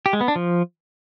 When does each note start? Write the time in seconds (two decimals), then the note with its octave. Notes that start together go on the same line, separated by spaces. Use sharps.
0.06 G4
0.13 G#3
0.21 B3
0.28 D4
0.36 F3